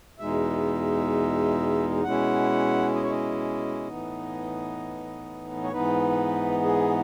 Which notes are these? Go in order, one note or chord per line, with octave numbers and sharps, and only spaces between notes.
E2 B2 G#3 D#4 E5
B2 G#3 C#4 E4 F#5
D#5
C#5
D#5
A2 E3 B3 D#4
C#5
G#2 E3 B3 D#4 B4
G#4